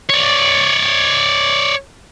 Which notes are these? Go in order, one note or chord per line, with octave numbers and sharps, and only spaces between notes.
C#5 D5